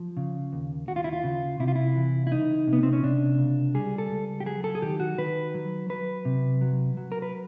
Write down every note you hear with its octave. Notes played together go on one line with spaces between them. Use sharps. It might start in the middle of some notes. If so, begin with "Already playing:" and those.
Already playing: F3
C#3
D#2
D#2 F#4
F4
E4
F4
C#3
C3 E4
F4
E4
E3
E4
C#2 D#4
C3
B3
C4
C#4
C3 D4
C#2
G3 G#4
A4
C#2
G4
F#3 G#4
A4
G#4
D#3 G4
F#4
D#3 B4
F#3
F#3 B4
C3
F#3
F#3
A#4
B4